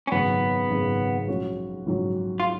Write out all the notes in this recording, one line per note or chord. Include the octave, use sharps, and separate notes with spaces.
C#4
G#1 F#2 C#3 B3
G#1 F#2 C#3
A#1 G#2 F#3 C#4 F#4
A#1 G#2 F#3 C#4 F#4
F4